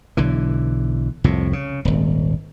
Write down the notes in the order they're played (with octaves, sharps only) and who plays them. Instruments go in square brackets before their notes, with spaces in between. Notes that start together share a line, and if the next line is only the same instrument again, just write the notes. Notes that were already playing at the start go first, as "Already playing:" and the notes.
[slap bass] B1 D3 E3
C2 F2 A2 C3
C#3
D#1 G#1